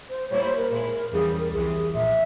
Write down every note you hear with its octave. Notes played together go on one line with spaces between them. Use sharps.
C5
A#2 G3 A#3 E4 C#5
C5
A#4
A#2 G#3 E4
E2 C#3 E3 G3 G#4
A#4
C2 C3 E3 G#4
A#1 A#2 E5